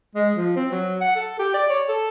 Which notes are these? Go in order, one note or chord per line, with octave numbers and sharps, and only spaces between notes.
G#3
F3
C4
F#3
F#5
A4
G4
D5
C#5
A4